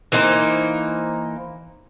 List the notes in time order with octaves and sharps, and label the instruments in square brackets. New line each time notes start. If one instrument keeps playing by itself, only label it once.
[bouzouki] E3 A#3 D#4 C5